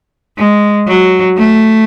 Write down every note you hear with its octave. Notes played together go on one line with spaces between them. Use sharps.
G#3
F#3
A3